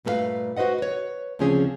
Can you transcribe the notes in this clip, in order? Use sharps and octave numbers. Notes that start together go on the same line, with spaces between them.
G2 A#2 A3 A4 B4 F5
F#4 B4 C5 D#5 F#5
B4 C#5
D2 C#3 F3 C4 C#4 G#4